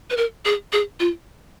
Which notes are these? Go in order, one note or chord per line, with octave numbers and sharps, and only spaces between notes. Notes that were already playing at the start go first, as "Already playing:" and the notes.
B4
A#4
G#4
G#4
F4